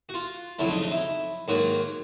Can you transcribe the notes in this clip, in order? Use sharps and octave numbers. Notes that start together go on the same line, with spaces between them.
F#4
F4
F2 C#3 F#3 A3 E4
D#4
D#4
E4
G#2 D#3 F#3 A#3 F#4